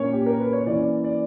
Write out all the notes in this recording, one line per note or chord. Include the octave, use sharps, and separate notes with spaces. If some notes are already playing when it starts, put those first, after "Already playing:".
Already playing: A#2 A#3 C#4 C#5
G4
A#4
B4
C#5
E3 A#3 C#4 D5
D5